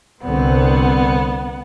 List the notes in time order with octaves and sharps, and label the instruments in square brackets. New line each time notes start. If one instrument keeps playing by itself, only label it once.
[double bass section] C2 D3 C4 [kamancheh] B3 F#5